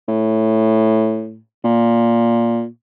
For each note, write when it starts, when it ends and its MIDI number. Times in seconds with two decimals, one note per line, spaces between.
0.08 1.39 45
1.64 2.66 46